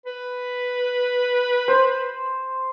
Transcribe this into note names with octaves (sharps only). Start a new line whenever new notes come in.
B4
C5